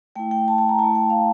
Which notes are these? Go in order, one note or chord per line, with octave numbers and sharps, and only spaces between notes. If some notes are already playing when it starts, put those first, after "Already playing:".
A3 E4 G5
G5
A5
A5
A#5
A3 E4 A5
G5
F5